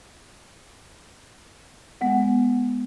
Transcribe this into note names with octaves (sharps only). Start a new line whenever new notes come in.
G#3 B3 F#5